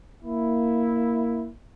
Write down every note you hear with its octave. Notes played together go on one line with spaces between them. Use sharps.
A#3 E4